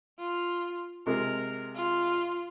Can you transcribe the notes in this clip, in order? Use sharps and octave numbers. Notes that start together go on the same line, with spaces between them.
F4
C3 G#3 A#4
F4